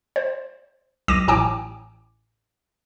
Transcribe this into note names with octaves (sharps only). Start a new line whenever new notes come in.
C5
B1 D6 A#6 D#7
A1 A2 G5 G#5 D6